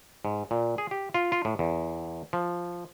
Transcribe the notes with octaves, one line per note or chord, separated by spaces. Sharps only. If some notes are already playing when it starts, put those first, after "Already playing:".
G#2
A#2
G#4
G4
F4
F4
A2
E2
F3